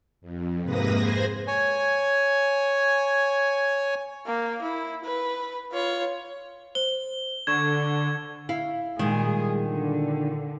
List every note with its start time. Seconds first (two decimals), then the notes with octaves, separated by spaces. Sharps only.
0.21 F2
0.63 G#2 C3 A#3 B4 D#6 A#6
0.94 G#4 C5 G#5 A#6
1.47 C#5 G#5
4.26 A#3
4.62 E4
5.05 B4
5.72 F4 C#5
6.75 C5 G7
7.47 D3 C#6 G#6 E7
8.49 E4 F5
8.99 A#2 D#3 G3 G#3 G#4
9.68 D3